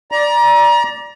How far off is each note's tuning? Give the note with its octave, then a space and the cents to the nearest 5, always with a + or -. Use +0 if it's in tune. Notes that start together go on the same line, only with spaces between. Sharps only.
D5 +0 A#5 +30